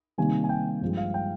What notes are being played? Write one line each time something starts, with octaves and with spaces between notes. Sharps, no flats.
C3 D#3 G3 A#3 G#5
G#5
G5
G2 F3 G#3
F5
G5